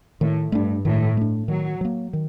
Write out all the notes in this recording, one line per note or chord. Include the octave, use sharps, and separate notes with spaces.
A2 D#3
G2 A3 D4
A2 D#3
A3 D4
D#3 F#3
F#3 A#3
D#3